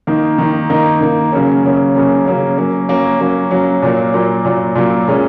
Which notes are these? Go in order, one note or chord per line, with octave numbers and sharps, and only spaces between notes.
D#3 A#3 D#4
D#3 A#3 D#4
D#3 A#3 D#4
D#3 A#3 D#4
C#3 F#3 A#3 C#4
C#3 F#3 A#3 C#4
C#3 F#3 A#3 C#4
C#3 F#3 A#3 C#4
F#3 A#3 C#4
F#3 A#3 C#4
F#3 A#3 C#4
F#3 A#3 C#4
A#2 F#3 A#3
A#2 F#3 A#3
A#2 F#3 A#3
A#2 F#3 A#3
A#2 G#3 C#4